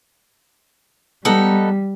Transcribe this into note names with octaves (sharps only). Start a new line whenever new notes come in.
G3 B3 D#4 A4